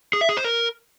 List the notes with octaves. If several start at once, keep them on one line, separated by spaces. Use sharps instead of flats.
G#4
E5
G#4
C5
A#4